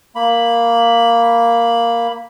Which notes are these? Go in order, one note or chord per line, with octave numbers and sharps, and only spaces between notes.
A#3 B5